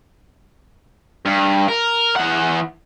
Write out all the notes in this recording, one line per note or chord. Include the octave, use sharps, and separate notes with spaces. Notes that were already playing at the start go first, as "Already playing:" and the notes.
G2
A#4
E3 F#5